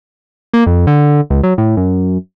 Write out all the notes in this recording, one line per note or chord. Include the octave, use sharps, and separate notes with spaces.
A#3
F2
D3
C#2
F#3
A2
F#2